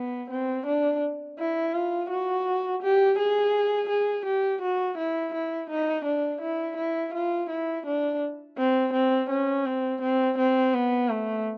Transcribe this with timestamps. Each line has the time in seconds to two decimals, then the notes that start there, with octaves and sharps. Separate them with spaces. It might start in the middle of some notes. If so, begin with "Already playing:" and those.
Already playing: B3
0.30 C4
0.66 D4
1.39 E4
1.74 F4
2.10 F#4
2.82 G4
3.18 G#4
3.89 G#4
4.25 G4
4.62 F#4
4.98 E4
5.34 E4
5.70 D#4
6.05 D4
6.41 E4
6.77 E4
7.14 F4
7.50 E4
7.86 D4
8.58 C4
8.93 C4
9.30 C#4
9.66 C4
10.01 C4
10.38 C4
10.74 B3
11.10 A3